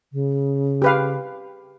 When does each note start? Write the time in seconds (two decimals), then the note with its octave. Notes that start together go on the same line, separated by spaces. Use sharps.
0.13 C#3
0.82 G4 B4 F5